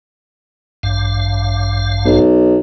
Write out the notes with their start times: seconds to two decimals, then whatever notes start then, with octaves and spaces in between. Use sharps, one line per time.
0.83 A1 G2 F5
2.05 B1